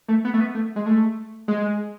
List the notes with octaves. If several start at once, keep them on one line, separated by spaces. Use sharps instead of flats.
A3
B3
A3
B3
A3
G#3
A3
G#3